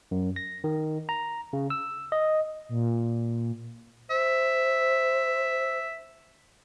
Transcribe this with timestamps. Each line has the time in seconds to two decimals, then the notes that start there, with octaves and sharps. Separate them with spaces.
0.11 F#2
0.36 A#6
0.64 D#3
1.09 A#5
1.53 C#3
1.70 E6
2.12 D#5
2.69 A#2
4.10 C5 E5